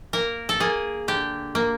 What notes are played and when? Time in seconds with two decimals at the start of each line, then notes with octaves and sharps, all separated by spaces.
0.13 A#3 A#4
0.49 A4
0.60 A#3 G#4
1.08 D3 G4
1.55 A#3